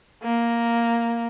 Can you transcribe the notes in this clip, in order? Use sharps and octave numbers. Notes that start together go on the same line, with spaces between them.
A#3